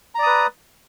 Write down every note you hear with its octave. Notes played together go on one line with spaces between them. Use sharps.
B4 D5 A#5 D#6